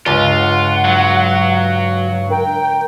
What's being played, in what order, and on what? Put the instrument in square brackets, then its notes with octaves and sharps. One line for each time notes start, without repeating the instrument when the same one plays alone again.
[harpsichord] C#2 [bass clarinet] G2 [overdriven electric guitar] F4
[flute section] F#5
[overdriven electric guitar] F#3
[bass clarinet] A#4 [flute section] G5